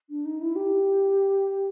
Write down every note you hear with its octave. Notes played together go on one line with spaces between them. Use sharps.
D4
D#4
E4
G4